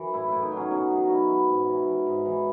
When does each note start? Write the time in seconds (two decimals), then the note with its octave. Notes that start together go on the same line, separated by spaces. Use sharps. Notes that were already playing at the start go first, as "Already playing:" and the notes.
Already playing: F#2 E3 C#4
0.13 A2 E4
0.28 A2 E4
0.42 D#4
0.52 F#3
0.57 C#4
0.71 B2 C#4
0.91 F#3 D#4
1.03 F#4
1.10 B2 E4
1.29 E3 E4
1.48 G#2
1.58 F#4
1.68 E3
1.87 E3
2.07 G#2
2.25 E3